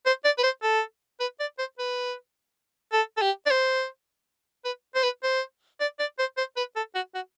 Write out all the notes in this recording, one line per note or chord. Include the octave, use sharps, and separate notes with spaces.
C5
D5
B4
C5
A4
B4
D5
C5
B4
A4
A4
G4
D5
C5
B4
C5
B4
C5
D5
D5
C5
C5
B4
A4
F#4
F#4